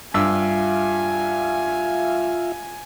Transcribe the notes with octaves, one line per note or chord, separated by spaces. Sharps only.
G2 F4 E5 F5 G#5 E6